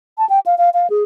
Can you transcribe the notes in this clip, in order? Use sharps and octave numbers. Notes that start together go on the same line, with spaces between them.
A5
G5
F5
F5
F5
G#4